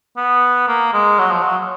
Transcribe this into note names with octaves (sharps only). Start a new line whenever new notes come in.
B3
A#3
G#3
F#3
F3
F#3